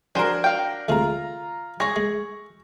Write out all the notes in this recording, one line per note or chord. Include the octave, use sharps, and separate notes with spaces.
F3 D4 F#4 G#4 A#4 C5
F5 G5
D2 C3 G#3 F4 A#5
F4 G#4 C#5 C#6 A#6
G#3